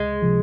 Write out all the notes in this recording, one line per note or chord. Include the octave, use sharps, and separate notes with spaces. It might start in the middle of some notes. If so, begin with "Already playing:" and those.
Already playing: C#2 G#3
C3 F3